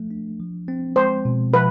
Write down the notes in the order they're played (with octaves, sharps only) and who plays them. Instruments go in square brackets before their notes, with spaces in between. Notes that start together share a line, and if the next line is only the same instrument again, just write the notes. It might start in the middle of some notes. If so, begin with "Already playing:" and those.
Already playing: [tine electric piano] F3 A3
D4
F3
C4
[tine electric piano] G#3 [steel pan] C5
[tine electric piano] B2
[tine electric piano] F3 [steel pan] B4